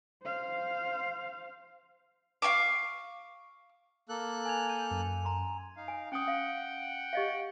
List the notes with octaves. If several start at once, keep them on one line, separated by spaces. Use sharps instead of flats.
C5 F5
F5 G5 C#6 D6
A#3 A4 F#6
G#5 G#6 F7
G6 D#7
F#2
A#5 C6
D#4 F5
G#5
C#4 F#5 G5 D#6
F5
G4 D#5 F5